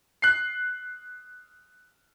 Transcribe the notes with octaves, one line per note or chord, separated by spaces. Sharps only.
F#6 C7